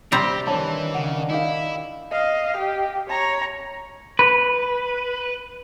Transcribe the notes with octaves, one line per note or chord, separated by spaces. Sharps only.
C3 G3 C4 G4 A#5
D#3 E3 D4 C#5 A5 B5
C#3 F#5
D#4 E4 G4 F5
D#5 F5
G4
C#5 A#5
B4